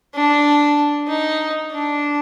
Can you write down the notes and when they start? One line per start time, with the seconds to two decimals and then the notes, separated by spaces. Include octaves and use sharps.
0.15 D4
1.08 D#4
1.71 D4